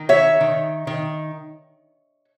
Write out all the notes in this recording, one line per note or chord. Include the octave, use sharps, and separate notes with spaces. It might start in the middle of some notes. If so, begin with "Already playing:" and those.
Already playing: D#3
C#5 E5
D#3
D#3